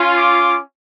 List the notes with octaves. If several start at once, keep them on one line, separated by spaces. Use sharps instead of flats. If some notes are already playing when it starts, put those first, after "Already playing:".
Already playing: C#4 F4
D6